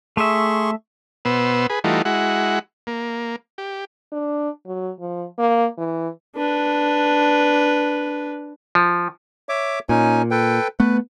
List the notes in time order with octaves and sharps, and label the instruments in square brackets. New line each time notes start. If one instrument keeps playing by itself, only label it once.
[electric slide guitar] A3 E5 [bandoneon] G#4 C6 C#6
[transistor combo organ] B2 B3 C5 E6
G#4 B4
E3 G3 A3 D#4 F4 F#4
G#3 E4 F#4 F#5
A#3
G4
[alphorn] D4
F#3
F3
A#3
E3
[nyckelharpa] D4 B4
[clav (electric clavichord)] F3
[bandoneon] C#5 E5 D6
[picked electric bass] A#2 [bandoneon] C#4 D#4 G#5
[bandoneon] A4 B4 G5
[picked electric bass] A3 B3 [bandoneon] B4